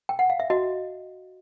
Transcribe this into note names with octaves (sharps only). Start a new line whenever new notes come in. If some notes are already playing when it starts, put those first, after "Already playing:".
G5
F#5
F5
E5
F#4 D#5